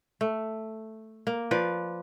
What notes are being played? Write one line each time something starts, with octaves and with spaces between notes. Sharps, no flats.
A3
A#3
F3 B4 D5